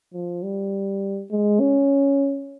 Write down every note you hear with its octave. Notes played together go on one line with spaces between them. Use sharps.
F3
G3
G#3
C#4